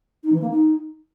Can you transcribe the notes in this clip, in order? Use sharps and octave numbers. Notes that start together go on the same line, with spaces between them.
D#4
E3
A#3
D#4